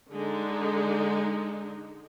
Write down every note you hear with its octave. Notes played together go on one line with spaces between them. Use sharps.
D3 G#3 D#4